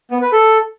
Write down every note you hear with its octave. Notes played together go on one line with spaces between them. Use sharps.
B3
B4
A4